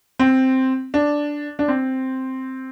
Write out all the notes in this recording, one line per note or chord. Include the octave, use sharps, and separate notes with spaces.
C4
D4
D4
C4